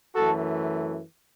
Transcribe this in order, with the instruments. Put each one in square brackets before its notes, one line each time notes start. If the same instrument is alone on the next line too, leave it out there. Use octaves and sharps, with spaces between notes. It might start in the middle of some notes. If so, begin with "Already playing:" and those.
[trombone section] F#2 E3 A3 F#4 A4